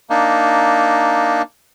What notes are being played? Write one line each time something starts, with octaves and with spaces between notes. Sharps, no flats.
A#3 D4 D#4